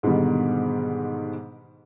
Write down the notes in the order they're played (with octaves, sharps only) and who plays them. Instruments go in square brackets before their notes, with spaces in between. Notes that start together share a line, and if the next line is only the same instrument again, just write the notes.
[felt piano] G#2 B2 D3 D#3 G3